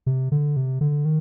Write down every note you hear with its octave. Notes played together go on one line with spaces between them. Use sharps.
C3
D3
C3
D3
D#3